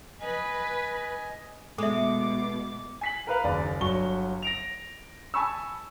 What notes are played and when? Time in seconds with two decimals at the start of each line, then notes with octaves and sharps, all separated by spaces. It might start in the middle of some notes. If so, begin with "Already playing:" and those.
0.22 B4 D#5 G#5
1.78 B2 G#3 A4 E5 D6
3.01 G#5 B6 F#7
3.27 A#4 B4 F5
3.44 F#1 D#2 D5
3.81 G1 F#3 C#6 G7
4.42 A#6 D7 F7
5.34 G#5 A5 B5 C#6 E6